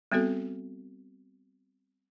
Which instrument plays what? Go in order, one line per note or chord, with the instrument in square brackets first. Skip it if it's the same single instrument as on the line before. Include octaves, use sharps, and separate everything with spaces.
[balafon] G3 B3 C4 F#4 A4